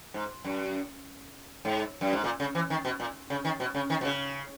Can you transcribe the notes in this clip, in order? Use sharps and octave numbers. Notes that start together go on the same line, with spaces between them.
G#2
F#2
G#2
F#2
G#2
A#2
C#3
E3
D#3
B2
A#2
C#3
D#3
B2
C#3
D#3
B2
C#3